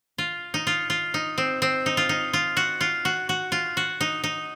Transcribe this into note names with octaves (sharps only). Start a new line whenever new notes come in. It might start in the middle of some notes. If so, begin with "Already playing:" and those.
F4
D#4
F4
F4
D#4
C4
C4
D#4
F4
D#4
F4
F#4
F4
F#4
F#4
F4
F#4
D#4
D#4